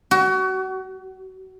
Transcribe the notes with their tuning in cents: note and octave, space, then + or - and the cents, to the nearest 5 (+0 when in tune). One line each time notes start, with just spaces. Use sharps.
F#4 +30